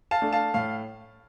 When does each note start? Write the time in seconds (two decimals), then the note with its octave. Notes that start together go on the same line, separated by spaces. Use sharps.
0.11 F5 A5
0.22 A3 D4
0.33 F5 A5
0.54 A2 F5